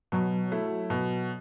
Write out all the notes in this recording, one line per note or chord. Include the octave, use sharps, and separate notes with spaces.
B2 F#3
A3 E4
B2